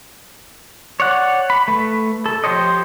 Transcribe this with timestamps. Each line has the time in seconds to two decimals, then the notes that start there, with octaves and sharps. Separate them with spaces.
1.00 C#5 D5 F#5
1.50 B5
1.68 A3 B4
2.26 A4
2.44 F3 G4 C5 C#5 D#5